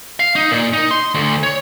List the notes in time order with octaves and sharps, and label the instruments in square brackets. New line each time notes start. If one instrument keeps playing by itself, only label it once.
[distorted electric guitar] F5
D#4
A#2
D#4
C6
D2
C#5